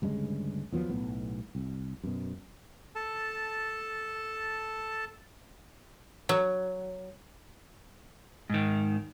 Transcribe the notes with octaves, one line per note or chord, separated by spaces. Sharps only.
D2 G2 C#3 G#3
D#2 F3 F#3 B3
B1 A2 B3
C2
F#2 B2
A4 A5
F#3
G#2 D#3